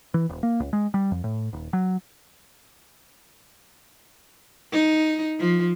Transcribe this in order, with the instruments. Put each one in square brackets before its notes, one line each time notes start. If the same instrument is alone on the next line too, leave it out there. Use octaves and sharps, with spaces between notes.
[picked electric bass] E3
D#1
A#3
C#2
G#3
G3
F2
A2
D#1
F#3
[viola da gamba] D#4
F3